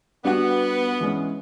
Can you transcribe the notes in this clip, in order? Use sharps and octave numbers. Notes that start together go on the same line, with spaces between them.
G3 B3 D4 F#4 G4
E3 G#3 C#4